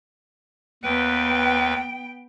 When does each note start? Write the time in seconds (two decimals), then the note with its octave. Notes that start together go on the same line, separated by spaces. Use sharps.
0.83 D#2 B3 B4 G5